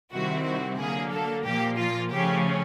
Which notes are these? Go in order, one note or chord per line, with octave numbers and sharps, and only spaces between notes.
C3 D#3 G3 C4 E4 F#4
F#4
D3 F#3 A#3 G#4
A4
A#2 F3 A#3 G4
F4
C#3 F3 A3 C#4 G4